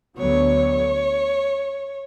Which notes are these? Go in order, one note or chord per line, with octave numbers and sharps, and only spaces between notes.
D2 D3 F#3 B3 C#5